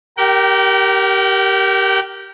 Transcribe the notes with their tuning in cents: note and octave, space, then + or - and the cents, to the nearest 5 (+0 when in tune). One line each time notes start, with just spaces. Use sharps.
G4 -10 A#4 +5 G5 -40